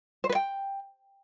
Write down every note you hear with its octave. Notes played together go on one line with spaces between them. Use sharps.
C5
B4
G5